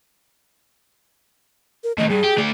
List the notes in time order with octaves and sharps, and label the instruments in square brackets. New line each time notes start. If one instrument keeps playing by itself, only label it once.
[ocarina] A#4
[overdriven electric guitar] A2 D#3 [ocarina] D#5
[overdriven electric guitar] G2 [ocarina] G#4
[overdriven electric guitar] G4
A3 D5